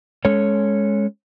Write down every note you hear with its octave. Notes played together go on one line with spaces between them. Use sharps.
G#3 C#4 A4 C#5